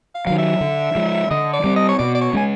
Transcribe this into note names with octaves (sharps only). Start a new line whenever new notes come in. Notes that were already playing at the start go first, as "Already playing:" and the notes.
F5
D#3 F#3 F5
E5
D3
F3 G#3
D3 D#5
D5
G3 C4
D#5
C#5
B2 D5
D5
C#5
G#3 C#4 G#5